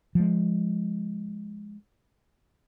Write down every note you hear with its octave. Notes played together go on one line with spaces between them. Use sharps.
F3 G#3